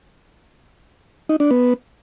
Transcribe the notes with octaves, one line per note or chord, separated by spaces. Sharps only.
D#4
D4
B3